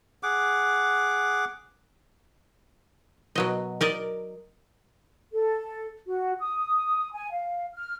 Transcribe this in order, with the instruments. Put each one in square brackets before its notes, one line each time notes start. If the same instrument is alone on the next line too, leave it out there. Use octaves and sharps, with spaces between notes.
[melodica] G#4 F#5 D6
[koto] B2 F#3 D#5
A#4 D5 D#5
[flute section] A4
F#4
D#6
G#5
F5
F6